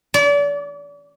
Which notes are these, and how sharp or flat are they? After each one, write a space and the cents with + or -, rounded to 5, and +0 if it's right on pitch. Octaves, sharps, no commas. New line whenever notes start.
D5 -35